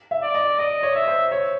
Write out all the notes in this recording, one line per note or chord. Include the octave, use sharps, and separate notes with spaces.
E5
D5
D#5
D5 D#5
C#5
C#5 E5
C5
C#5